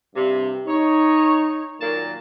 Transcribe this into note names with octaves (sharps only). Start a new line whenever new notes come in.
G2 C3
D#4 C#5
A#2 D#3 F#3 A#3 A5